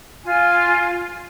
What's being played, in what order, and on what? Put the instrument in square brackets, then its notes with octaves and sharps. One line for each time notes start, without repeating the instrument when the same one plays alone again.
[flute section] F4 G#5